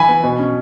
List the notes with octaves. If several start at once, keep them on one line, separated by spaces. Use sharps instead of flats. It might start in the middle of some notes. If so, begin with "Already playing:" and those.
Already playing: E3 G#5 B5
B3
B2
C#4